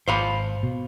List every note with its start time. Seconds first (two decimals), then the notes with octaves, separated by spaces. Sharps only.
0.08 G#1 C5 F5 B5
0.63 B2